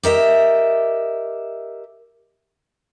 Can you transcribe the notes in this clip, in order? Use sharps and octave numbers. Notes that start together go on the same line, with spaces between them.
G4 A#4 D#5 E5